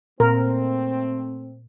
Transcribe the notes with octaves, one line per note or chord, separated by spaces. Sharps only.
A#2 A3 C4 A#4